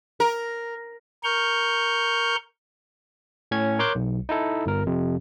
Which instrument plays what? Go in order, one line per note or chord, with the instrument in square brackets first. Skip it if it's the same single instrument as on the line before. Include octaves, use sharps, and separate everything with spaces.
[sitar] A#4
[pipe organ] A#4 C#6 F6 G6
[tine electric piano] A2 C#4 G#6
A#4 C#5 C6 D6 F#6 G6
B1
D#4 E4 A4
G1 A#4
F2 C3